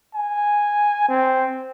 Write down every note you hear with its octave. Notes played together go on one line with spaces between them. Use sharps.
G#5
C4